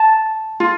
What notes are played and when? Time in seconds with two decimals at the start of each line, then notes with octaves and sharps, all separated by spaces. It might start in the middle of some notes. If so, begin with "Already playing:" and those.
Already playing: A5
0.60 F4